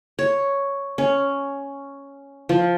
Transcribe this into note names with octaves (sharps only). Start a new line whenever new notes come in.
C#5
C#4
F3